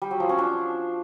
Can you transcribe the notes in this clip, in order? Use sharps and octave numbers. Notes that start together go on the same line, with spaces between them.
G3
F#3
F3
C#4
D4